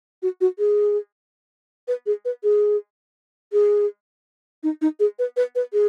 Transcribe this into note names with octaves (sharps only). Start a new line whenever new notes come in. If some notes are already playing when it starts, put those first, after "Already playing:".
F#4
F#4
G#4
B4
G#4
B4
G#4
G#4
D#4
D#4
G#4
B4
B4
B4
G#4